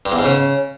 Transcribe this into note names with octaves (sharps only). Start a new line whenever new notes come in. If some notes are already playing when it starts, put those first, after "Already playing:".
G2
E2
G#2
C#3